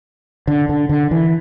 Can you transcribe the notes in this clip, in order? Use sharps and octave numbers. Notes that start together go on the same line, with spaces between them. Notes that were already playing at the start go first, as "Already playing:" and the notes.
D3
D3
D3
E3